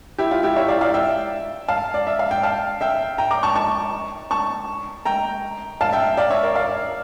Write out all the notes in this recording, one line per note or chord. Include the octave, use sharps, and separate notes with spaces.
E4 G4
F4
E4 G4
C#5 E5
D5 F5
D5 F5
E5 G5
F5 A5
D5
E5
F5
G5
F5 A5
E5 G5
G5 A#5
A#5 D6
A5 C#6
A5 C#6
A5 C#6
G5 A#5
F5 A5
E5 G5
D5 F5
C#5 E5
A#4 D5
D5 F5